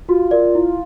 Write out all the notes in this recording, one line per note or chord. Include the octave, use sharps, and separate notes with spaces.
F4 F#4
A#4 D5
E4